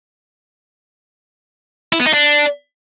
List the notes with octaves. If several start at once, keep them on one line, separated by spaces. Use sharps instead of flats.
E4
B3
D#4
D4